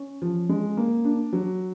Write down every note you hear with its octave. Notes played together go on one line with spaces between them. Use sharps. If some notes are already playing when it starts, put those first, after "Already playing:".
Already playing: C#4
F3
G#3
A#3
D4
F#3